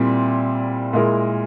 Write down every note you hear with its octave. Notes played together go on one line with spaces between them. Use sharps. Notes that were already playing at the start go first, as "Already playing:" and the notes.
Already playing: A#2 G3 C4 E4
A#2 G#3 E4 A#4